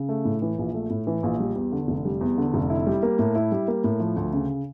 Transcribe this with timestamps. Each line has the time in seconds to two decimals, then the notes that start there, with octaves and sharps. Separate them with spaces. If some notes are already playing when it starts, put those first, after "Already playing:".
Already playing: C#3
0.09 A3
0.25 A2
0.42 E3
0.58 A#1
0.74 A3
0.90 A2
1.07 E3
1.23 A#1
1.40 G3
1.56 E2
1.72 D3
1.88 F1
2.05 G3
2.21 E2
2.38 D3
2.54 F1
2.70 E4
2.87 G3
3.03 A#3
3.19 A2
3.35 E4
3.52 G3
3.68 A#3
3.84 A2
4.00 F3
4.16 D2
4.33 C#3